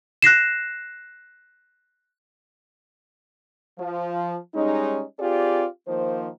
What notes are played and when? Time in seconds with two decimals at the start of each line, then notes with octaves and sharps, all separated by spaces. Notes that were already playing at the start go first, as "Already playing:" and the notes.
0.22 F#6 A#6 C7 E7
3.79 F3
4.55 G3 G#3 C#4 D#4
5.20 C4 F4 G4 G#4 D5
5.88 D#3 F3 A#3 C5